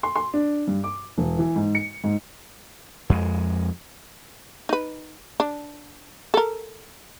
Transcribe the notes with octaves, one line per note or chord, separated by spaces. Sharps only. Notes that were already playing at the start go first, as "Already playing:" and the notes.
C6
C6
D4
G2
D6
E1
E3
G#2
C#7
G#2
F2 G#3
D#4 B4
D4
A4 A#4